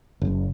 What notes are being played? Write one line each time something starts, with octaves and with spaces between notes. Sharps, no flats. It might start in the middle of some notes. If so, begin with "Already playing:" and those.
F#1